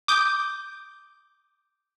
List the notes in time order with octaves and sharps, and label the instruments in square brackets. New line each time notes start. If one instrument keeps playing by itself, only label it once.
[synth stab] D6 D#6 G6